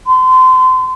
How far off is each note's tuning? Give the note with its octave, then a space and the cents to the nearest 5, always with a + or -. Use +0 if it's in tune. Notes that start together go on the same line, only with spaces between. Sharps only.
C6 -30